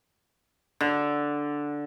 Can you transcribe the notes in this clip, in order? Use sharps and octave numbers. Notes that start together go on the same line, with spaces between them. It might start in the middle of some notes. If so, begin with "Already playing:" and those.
D3